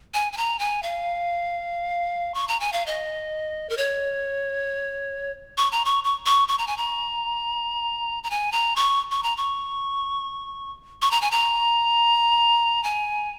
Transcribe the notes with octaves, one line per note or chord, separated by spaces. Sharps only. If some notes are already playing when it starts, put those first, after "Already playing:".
G#5
G#5
A#5
G#5
F5
C#6
A#5
G#5
F5
D#5
A#4
C#5
C#6
A#5
C#6
C#6
C#6
C#6
A#5
G#5
A#5
A#5
G#5
A#5
C#6
C#6
A#5
C#6
C#6
A#5
G#5
A#5
G#5